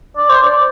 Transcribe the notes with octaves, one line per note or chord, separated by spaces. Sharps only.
D5
C5
D5